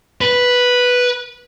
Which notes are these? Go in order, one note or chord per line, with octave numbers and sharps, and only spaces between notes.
B4